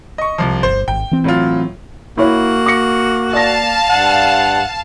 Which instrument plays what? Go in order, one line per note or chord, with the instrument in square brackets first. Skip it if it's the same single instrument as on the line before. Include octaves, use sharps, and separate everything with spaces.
[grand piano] D#5 C#6
C2 F3
[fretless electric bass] G1 [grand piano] C5
[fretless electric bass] G#1 [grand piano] G5
[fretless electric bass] E3 C4
[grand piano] A2 F#3 F4
[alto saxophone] A#3 [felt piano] E4 C#5 [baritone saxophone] F#4
[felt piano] D6 A#6 C#7
[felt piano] D5 A#6 [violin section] F5 A5
[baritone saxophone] G2 [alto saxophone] F#5